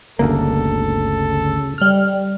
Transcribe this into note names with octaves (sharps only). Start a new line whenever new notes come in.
G1 D2 C#3 A#3 A4
G3 F6